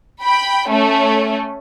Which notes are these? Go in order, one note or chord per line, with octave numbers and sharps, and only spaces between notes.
G5 B5
A3 C#4